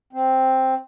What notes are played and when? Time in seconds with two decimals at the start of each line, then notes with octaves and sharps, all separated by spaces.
0.13 C4